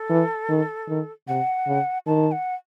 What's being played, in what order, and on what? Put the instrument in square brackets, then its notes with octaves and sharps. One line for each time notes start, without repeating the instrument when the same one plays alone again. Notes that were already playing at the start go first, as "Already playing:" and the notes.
Already playing: [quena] A4
[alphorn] E3
D#3
D#3
[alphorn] C3 [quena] F#5
[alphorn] C#3
[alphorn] D#3 [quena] A5
[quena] F#5